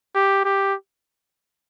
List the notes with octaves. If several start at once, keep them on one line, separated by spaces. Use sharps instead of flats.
G4
G4